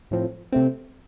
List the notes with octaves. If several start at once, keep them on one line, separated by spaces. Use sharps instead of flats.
A2 F3 C4
C3 A3 C4